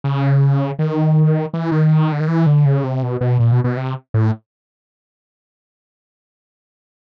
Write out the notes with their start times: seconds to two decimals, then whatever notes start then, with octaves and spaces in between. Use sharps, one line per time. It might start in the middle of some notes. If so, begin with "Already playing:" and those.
0.04 C#3
0.79 D#3
1.54 E3
1.72 D#3
2.12 D3
2.20 D#3
2.28 E3
2.46 D3
2.65 C#3
2.84 C3
3.03 B2
3.21 B2
3.40 A#2
3.52 B2
3.64 B2
3.77 C3
4.14 A2